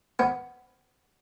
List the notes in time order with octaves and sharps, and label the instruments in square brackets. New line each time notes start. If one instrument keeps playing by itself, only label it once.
[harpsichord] B3